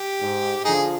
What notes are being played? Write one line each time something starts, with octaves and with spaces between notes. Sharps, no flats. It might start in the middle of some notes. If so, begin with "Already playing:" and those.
Already playing: G4
G#2
D3 F3 D#4 G#4